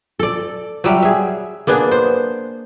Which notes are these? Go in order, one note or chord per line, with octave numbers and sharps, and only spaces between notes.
A4 D5
F#3 G3 E5
G#4 E5
A#3 B3 D4 G#4
C5